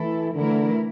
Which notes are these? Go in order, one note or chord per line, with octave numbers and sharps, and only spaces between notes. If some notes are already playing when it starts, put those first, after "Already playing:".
Already playing: E3 A3 E4 A4
D3 E3 A3 E4 A#4